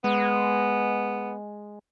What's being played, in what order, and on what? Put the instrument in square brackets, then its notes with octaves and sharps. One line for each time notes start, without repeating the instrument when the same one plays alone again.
[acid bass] G#3 [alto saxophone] B3